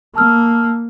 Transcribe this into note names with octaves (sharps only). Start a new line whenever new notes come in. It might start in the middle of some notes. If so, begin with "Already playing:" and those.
A#3 A5 E6 F6